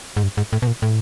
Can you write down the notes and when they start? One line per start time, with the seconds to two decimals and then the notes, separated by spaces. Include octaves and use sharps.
0.17 G#2
0.23 G2
0.37 G#2
0.53 A2
0.62 B2
0.67 A#2
0.82 A2